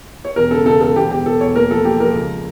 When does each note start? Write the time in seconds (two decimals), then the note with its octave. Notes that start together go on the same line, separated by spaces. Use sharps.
0.25 C#5
0.36 E1 A#4
0.51 C#3 A4
0.66 C#3 A4
0.80 E1 A4
0.96 E1 G4
1.11 E1 G4
1.26 E1 A4
1.41 E1 C#5
1.55 A#3 A#4
1.70 F3 A4
1.84 A#3 G4
2.00 F3 A#4
2.15 C#2